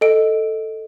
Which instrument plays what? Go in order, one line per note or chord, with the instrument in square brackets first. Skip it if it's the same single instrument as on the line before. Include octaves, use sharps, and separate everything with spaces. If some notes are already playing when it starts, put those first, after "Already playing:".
[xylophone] A4 D#5 D7